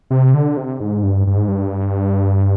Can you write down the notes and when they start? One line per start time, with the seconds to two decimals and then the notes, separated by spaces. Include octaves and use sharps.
0.10 C3
0.34 D3
0.57 C3
0.80 G#2
1.03 G2
1.27 G2
1.37 G#2
1.48 G2